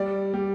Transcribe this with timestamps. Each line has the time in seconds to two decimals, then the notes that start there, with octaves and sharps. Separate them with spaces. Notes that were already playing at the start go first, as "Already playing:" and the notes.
Already playing: G3 D5
0.34 G3